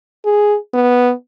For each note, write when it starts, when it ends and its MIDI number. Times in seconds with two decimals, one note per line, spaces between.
0.25 0.56 68
0.74 1.12 59